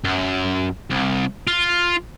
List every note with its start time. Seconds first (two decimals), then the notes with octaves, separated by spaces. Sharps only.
0.04 F#2
0.91 C2
1.47 F4